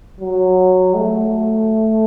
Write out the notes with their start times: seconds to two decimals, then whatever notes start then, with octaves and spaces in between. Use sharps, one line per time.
0.21 F#3
0.96 A3